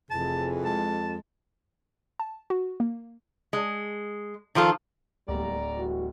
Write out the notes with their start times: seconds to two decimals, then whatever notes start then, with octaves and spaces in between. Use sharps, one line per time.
0.11 F1 F2 E3 G#4 A5
0.65 G#3 A5
2.20 A5
2.50 F#4
2.80 A#3
3.53 G#3
4.55 D#3 F3 F4 A4
5.28 D1 G3 A#3 D5 A#5
5.76 E3 G3 F#4